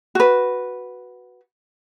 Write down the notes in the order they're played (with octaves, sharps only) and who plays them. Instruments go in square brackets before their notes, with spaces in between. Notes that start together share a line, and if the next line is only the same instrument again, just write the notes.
[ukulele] F#4 B4